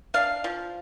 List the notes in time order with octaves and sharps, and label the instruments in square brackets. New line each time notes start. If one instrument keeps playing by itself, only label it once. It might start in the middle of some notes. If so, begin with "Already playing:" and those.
[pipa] D4 F5
F3